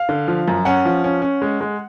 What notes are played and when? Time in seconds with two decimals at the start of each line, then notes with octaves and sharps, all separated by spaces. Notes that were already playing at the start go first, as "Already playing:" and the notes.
Already playing: F5
0.09 D3
0.28 F3
0.48 F#2
0.65 C#4 F#5
0.85 F3
1.04 C#4
1.22 C#4
1.42 G#3
1.61 G#3